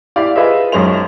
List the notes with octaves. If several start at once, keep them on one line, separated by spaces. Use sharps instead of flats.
E4 G4 D5 F5
F4 G#4 B4 C5 D#5 E5
B1 F#2 G#3 C#4 C5 F7